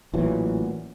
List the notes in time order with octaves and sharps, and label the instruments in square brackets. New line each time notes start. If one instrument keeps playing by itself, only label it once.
[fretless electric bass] A1 A#2 E3 F#3